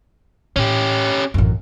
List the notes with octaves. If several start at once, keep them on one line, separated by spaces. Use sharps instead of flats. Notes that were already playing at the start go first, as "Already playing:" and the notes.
A2 C#4 G4
A1 F#2